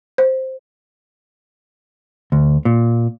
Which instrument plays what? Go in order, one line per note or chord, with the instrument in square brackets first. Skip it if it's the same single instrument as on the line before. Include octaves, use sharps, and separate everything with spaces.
[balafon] C5
[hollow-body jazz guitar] D2
A#2